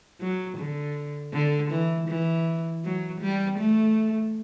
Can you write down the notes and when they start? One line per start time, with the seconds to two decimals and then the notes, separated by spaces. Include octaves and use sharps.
0.21 F#3
0.58 D3
1.33 D3
1.71 E3
2.09 E3
2.84 F#3
3.21 G3
3.59 A3